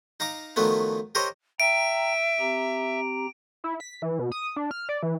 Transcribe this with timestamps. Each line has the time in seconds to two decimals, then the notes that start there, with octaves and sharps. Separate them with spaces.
0.20 D#4 F5 A#5 D6
0.56 D#3 F3 F#3 A3 B3
1.15 G4 A#4 C5 C#5 D#5
1.60 E5 G5 A#5 D7
2.40 C4 G4 A#5
3.64 E4
3.80 B6
4.02 E3
4.19 B2
4.32 D#6
4.56 D4
4.71 F6
4.89 D5
5.03 E3